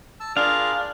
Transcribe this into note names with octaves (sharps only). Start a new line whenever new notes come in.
A5 E6
D4 F4 G#4 A#4 F5